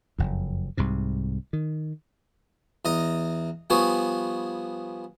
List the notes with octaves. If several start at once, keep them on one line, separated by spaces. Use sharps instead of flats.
F#1 F2
C2 G#2 C3
D#3
E2 D#5 A#5
F3 G3 B3 G#4 C#5